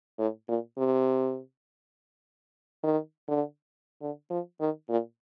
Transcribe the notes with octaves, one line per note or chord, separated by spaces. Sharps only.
A2
A#2
C3
D#3
D3
D3
F3
D#3
A#2